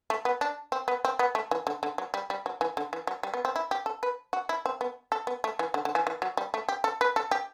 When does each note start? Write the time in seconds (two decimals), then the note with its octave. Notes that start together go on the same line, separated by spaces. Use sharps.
0.10 A3
0.25 B3
0.41 D4
0.72 C4
0.88 B3
1.05 C4
1.19 B3
1.35 A3
1.51 E3
1.67 D3
1.83 D3
1.98 F#3
2.14 G3
2.30 G3
2.46 F#3
2.61 E3
2.77 D3
2.93 E3
3.07 F#3
3.23 G3
3.34 B3
3.45 C4
3.56 E4
3.71 G4
3.86 A4
4.03 B4
4.33 F#4
4.49 E4
4.66 C4
4.81 B3
5.12 A4
5.27 B3
5.44 A3
5.59 E3
5.74 D3
5.85 D3
5.95 E3
6.07 E3
6.22 F#3
6.37 G3
6.54 A3
6.69 G4
6.84 A4
7.01 B4
7.16 A4
7.31 G4